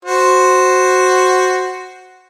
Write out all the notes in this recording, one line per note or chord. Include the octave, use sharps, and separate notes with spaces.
F#4 C5